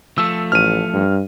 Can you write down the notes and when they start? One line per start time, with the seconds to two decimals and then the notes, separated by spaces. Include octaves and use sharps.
0.18 F3 A3 E6
0.52 A1 F6 D#7
0.93 G2